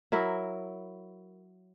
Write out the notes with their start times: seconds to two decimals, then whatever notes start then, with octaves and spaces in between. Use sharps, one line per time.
0.12 F#3 E4 A#4 E5